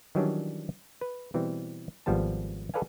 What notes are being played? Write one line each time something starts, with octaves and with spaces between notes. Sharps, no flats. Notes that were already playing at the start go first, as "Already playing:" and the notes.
D#3 E3 F#3 G3 C#4 D4
B4
B2 E3 G3 C4
G#1 F3 G3 B3 A5
G#4 A4 B4 D5 F5 G#5